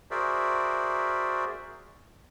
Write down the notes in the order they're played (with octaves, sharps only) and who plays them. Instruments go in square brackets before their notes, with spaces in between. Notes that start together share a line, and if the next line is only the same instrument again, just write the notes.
[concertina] F#4 G#4 A#4 C5 D5 E5